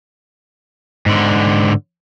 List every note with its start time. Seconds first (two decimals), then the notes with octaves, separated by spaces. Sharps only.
1.06 G#2 D3